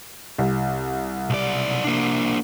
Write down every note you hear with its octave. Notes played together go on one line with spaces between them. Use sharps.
C2
B1 D5
A#3 D4